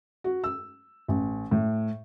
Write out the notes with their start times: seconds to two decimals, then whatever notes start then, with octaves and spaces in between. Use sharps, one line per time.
0.24 F#4
0.44 E6
1.08 A1
1.51 A2